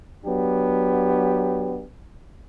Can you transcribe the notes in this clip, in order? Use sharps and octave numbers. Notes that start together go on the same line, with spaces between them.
F#3 B3 D4 G4